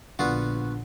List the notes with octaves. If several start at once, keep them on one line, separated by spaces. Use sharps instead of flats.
A#1 D3 B3 F4 F#4